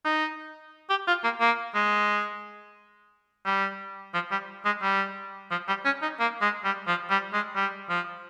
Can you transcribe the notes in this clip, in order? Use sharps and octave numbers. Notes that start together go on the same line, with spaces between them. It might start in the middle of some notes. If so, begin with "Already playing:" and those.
D#4
G4
F4
A#3
A#3
G#3
G3
F3
G3
G#3
G3
F3
G3
C#4
D#4
A#3
G#3
G3
F3
G3
G#3
G3
F3